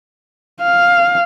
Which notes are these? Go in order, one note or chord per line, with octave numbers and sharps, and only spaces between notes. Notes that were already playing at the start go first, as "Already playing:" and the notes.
F5